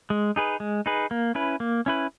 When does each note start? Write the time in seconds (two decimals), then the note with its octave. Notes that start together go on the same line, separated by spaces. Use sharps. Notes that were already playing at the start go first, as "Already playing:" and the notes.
0.10 G#3
0.36 D#4 G#4 B4
0.60 G#3
0.86 D#4 G#4 B4
1.11 A#3
1.35 C#4 E4 B4
1.60 A#3
1.86 C#4 E4 B4